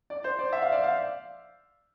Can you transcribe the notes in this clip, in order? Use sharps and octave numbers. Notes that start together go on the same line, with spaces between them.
D5
C5
D5
E5
F5
D5
F5